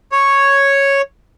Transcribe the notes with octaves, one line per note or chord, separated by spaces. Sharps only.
C#5